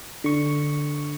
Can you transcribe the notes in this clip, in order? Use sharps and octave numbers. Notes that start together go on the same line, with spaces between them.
D3 C#6